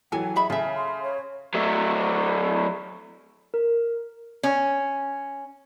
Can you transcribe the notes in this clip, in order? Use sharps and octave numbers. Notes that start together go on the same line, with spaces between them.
E3 F#3 A4 G5 G#5
G#4 D#5 E5 B5
C#3 A4 E5 G#5
C6
C#5
F#3 A3
A#4
C#4